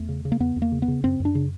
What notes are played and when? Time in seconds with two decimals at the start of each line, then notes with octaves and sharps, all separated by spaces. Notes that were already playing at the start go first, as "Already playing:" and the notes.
Already playing: E2 A3
0.09 C#3
0.25 C#3
0.32 A#3
0.40 E2 B3
0.56 E2
0.62 A#3
0.72 C#3
0.82 B3
0.88 C#3
1.04 F#2 C4
1.20 F#2
1.25 D4
1.35 C#3